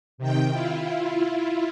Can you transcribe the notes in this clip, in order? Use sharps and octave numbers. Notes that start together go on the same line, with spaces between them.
C3 D#3 G5
E4 F4